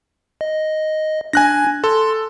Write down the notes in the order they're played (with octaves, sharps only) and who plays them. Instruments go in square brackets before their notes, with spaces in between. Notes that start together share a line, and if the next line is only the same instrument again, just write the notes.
[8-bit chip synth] D#5
[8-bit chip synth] D4 [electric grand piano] G#5 F#6 A#6
[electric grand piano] A4 [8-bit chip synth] C6